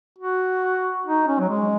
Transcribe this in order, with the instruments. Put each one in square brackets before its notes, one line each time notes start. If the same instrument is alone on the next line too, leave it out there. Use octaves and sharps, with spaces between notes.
[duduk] F#4
D#4
C#4
F#3
G#3